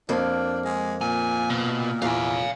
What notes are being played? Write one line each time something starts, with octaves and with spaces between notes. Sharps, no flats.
F2 A#3 D4
G#3
A#2 G#5
B2
E2 A#2 F5 G#5